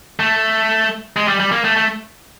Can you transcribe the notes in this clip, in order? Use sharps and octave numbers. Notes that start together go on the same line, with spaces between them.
A3
G#3
G3
G3
A#3
A3
A3